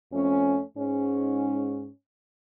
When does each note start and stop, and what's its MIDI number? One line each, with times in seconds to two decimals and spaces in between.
0.13 0.61 41
0.13 0.61 57
0.13 0.61 61
0.78 1.89 44
0.78 1.89 61